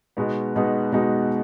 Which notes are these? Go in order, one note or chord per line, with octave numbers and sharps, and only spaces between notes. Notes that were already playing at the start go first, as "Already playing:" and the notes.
B2 G#3 B3 D#4 F#4
B2 G#3 B3 D#4 F#4
B2 G#3 B3 D#4 F#4